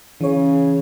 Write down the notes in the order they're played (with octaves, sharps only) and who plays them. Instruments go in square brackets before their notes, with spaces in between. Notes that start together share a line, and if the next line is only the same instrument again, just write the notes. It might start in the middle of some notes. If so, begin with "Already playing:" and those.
[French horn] C#3 [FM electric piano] E3 C#5